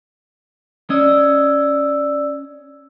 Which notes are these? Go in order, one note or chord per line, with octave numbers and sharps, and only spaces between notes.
C#4 D5 D#5 E6